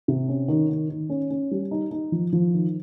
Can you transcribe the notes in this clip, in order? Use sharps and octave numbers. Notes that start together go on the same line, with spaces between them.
C3
C#4
D#3
D#3
D#3
C#4
C#4
G3
D#4
D#4
F3
F3
D#3